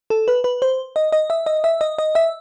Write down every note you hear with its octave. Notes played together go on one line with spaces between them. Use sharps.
A4
B4
B4
C5
D#5
D#5
E5
D#5
E5
D#5
D#5
E5